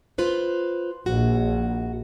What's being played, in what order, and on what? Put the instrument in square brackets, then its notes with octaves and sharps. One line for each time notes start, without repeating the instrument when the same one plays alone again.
[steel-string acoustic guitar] F4 B4 C5
[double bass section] A#1 [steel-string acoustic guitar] F#4